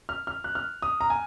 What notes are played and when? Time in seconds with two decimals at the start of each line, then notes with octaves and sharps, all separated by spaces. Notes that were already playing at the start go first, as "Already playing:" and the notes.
0.09 F6
0.27 F6
0.44 F#6
0.55 F6
0.82 D#6
1.01 A#5
1.10 G#5